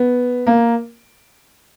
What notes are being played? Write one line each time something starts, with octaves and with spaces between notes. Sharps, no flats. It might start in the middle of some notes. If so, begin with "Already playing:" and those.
Already playing: B3
A#3